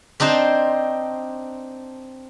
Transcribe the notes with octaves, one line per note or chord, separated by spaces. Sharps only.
C4 D4 D#4 C5